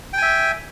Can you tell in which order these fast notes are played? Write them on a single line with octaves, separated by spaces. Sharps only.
G5 G#5 E5